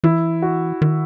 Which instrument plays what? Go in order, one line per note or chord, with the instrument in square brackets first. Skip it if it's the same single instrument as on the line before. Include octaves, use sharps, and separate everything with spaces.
[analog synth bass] E3 [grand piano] E4
[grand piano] F#4
[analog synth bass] D#3